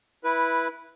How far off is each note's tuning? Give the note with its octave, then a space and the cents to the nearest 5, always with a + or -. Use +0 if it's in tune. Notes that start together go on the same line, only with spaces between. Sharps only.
E4 +0 B4 -10